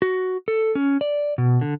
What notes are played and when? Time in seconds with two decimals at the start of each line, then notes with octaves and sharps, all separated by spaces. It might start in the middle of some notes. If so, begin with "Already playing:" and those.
0.02 F#4
0.48 A4
0.75 C#4
1.01 D5
1.38 B2
1.61 D3